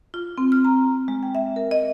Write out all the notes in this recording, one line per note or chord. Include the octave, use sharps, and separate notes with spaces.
F4
C4
F6
A#5
G#3
G5
E5
A#4
D#5